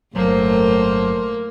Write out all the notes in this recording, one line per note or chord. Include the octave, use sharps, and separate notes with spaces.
G1 A2 F#3 A#3 A4 A#4 C5